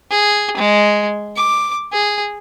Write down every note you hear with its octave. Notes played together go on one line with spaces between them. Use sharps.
G#4
G#3
D6
G#4